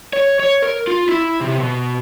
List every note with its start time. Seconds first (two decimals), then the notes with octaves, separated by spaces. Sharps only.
0.13 C#5
0.40 C#5
0.62 A#4
0.87 F4
1.09 E4
1.41 C3
1.60 B2